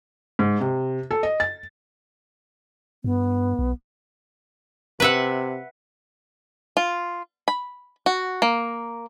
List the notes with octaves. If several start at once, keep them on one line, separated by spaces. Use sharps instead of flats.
G#2
C3
A4
D#5
A6
G2 B3
B1
C3 B4 E5 F#5
F4
B5
F#4
A#3